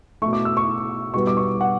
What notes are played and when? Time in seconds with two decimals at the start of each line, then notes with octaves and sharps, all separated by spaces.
0.22 A3 C#6
0.26 B2
0.33 D6
0.45 E6
0.57 C#6
1.14 B2 G3 B3 C#6
1.27 D6
1.37 C#6
1.61 F#5